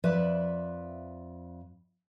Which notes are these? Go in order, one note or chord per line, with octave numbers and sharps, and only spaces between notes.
F2 F3 B4 D5 E5